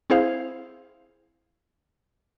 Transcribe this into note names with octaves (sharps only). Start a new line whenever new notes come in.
C4 E4 G#4 C5 F5